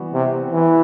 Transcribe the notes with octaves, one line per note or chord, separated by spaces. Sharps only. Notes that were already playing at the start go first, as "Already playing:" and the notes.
Already playing: E3 G3 B3 F#4
C3
E3